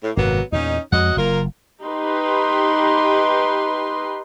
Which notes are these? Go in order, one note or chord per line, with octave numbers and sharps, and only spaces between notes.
A2
G#1 F#2 C3 F#3 A#3 B3
E2 A#2 C#4 D#4
F2 F#3 G#3 D#5 F#5
F#1 A#3 F4 A#4
D#4 G4 B4 C6